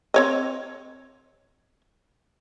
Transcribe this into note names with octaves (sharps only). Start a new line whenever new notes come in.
C4 C#5 D#5